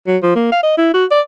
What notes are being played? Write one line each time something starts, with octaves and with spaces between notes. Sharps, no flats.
F#3
F3
A#3
F5
D#5
E4
F#4
D5